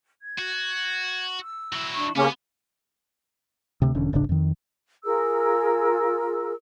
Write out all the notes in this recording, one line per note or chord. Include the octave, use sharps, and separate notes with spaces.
G#6
F#4
E6
F#3 E4
D4 C#6
C#3 A#3 B3 C#4 G4 G#4 D6
D2 C3
E1 D3 C#4
D#1 G#1 C#3 D4
F2 D#3
F4 G#4 A#4 E6